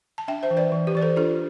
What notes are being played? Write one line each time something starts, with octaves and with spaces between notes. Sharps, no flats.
A5
D4 E5 G5
C5 E5
E3
B4 D5
E3
G4 B4
E3 D5
A4 C5
D4 F4 A4